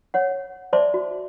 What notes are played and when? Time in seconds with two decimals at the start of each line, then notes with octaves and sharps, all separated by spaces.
0.14 C#5 F#5
0.73 C5 D5 E5 A5 C6 D6
0.94 F#4